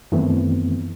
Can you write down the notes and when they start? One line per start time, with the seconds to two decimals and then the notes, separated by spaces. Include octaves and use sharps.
0.12 F#2 D#3 E3 A3 B3 C4